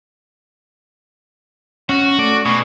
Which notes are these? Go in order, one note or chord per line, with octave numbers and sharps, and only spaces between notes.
C#4 F#4
A3 D5
B2 G#4 C#6